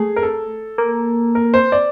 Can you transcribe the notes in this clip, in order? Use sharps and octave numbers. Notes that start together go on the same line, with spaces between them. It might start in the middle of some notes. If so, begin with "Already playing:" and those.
Already playing: A3 G#4
A#4
A4
A#3
A#4
C5
D5